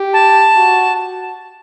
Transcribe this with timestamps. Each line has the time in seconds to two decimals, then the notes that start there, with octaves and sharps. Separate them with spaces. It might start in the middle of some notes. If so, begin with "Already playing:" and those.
Already playing: G4
0.13 A5
0.57 F#4